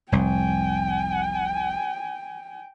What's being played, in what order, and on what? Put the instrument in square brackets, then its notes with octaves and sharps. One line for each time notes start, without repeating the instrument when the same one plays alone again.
[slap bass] F1 C2 [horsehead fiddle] G5 G#5